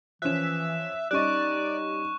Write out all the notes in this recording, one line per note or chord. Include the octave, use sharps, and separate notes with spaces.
E3 F3 C#4 E5 F#6 E7
G3 C#4 D#4 D5 D#5 C#6 F#6